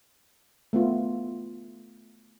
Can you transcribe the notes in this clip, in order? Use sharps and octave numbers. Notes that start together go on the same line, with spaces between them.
A3 B3 F4